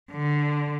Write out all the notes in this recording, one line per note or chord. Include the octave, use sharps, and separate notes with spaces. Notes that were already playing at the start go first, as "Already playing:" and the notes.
D3